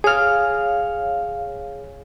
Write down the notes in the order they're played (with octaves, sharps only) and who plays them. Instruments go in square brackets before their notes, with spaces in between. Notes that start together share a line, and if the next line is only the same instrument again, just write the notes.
[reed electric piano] G#4 F6 [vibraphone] C#5 F5